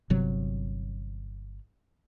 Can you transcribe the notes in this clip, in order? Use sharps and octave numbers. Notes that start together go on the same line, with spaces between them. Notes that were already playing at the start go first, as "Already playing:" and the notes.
G1 C3 F#3